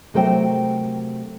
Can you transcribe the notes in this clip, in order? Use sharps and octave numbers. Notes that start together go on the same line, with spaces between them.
C3 F#3 A3 A#4 C5 G5